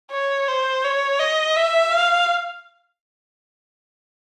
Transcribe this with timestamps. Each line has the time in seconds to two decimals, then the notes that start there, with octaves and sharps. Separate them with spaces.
0.12 C#5
0.48 C5
0.84 C#5
1.20 D#5
1.56 E5
1.92 F5